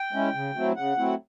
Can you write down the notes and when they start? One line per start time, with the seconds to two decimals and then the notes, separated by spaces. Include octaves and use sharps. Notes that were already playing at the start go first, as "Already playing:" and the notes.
Already playing: G5
0.13 G#3 C#4 E4
0.34 C#3
0.55 F#3 A3 C4 E4
0.76 C#3 F#5
0.98 F#3 A3 C4 E4